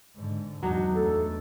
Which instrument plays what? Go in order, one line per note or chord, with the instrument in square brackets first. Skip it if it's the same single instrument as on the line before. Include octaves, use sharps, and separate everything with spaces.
[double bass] G#2 D3
[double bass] E2 [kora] F#3 D4 D#4
[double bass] E2 A3 [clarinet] A4